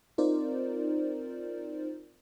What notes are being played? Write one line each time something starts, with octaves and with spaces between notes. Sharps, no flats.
C4 D#4 F4 A#4 C5 D5